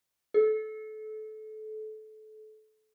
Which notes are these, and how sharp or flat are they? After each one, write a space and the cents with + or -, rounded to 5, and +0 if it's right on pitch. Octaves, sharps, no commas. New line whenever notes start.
A4 -25